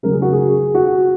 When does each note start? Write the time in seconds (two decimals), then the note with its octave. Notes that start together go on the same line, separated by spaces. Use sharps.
0.03 C#3 F#3 A#4
0.12 G#4
0.22 F#4
0.33 G#4
0.75 F#4